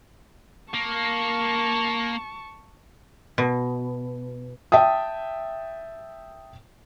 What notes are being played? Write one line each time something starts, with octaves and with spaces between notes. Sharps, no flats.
A#3 A5 C#6
B2
E5 G5 A5 D#6